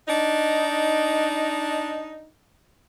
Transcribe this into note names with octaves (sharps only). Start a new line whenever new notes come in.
D4 D#4